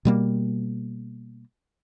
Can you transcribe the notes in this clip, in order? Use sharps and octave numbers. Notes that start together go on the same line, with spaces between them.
B2 G3 A#3